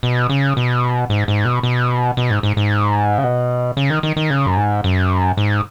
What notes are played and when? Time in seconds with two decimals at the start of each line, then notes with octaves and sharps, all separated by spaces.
0.03 B2
0.30 C#3
0.57 B2
1.10 G#2
1.28 G#2
1.45 B2
1.63 B2
2.17 B2
2.30 G#2
2.43 G#2
2.57 G#2
3.18 C#3
3.24 B2
3.77 C#3
3.90 D#3
4.03 D#3
4.16 D#3
4.30 C#3
4.46 F#2
4.57 G#2
4.84 F#2
5.37 G#2